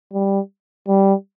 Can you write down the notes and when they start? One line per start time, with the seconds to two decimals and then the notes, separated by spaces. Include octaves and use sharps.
0.13 G3
0.87 G3